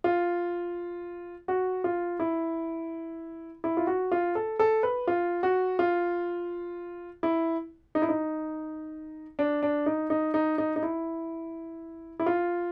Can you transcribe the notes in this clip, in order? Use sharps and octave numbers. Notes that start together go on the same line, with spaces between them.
F4
F#4
F4
E4
E4
F4
F#4
F4
A4
A4
B4
F4
F#4
F4
E4
D#4
E4
D#4
D4
D4
D#4
D#4
D#4
D#4
D#4
E4
E4
F4